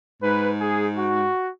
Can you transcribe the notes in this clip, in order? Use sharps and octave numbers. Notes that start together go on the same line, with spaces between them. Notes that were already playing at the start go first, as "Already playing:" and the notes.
G#2 B4
G#4
F#4